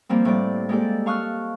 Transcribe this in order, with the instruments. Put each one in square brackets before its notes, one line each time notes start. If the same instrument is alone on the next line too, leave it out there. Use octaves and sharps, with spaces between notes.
[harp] F3 G3 A#3 C4
A2 G3 D5
G#3 A#3 G4 A4 D5
F5 A5 C#6 D#6 F6 F#6